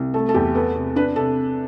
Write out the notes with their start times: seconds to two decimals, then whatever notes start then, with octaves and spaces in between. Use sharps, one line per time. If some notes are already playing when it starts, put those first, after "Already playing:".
Already playing: C2
0.14 A3 A4
0.29 A4
0.34 E2 G4
0.55 B3 A4
0.75 C3
0.96 D4 B4
1.16 C3 A4